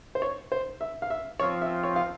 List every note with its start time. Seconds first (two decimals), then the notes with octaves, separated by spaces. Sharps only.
0.15 C5
0.22 C#5
0.52 C5
0.81 E5
1.02 F5
1.10 E5
1.40 F3 C4 F4 C#5
1.62 E5
1.83 C#5
1.96 F5